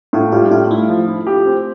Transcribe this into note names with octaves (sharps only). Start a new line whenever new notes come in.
A2 F4
G3 F4
A2 F4
A3 E4
F3
E4
G4
C4